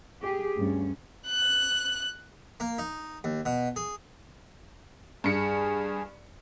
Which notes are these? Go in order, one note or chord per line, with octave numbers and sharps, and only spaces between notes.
G4 G#4
D2 G2 C#4
F#6
A#3
D#4
D#2
B2
G#4
G2 G#4 C#7